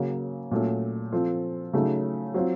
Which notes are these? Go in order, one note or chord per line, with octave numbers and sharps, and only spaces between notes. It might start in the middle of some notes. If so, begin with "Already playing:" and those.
Already playing: C#3 F#3 A#3
A#2 F#3 A3 C#4
F3 C4 F4 A4
C#3 F#3 A3 D#4
F#3 C4 F4